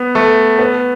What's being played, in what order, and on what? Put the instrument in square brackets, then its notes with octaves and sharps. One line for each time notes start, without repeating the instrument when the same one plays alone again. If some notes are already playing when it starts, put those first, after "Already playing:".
Already playing: [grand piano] B3
A3
B3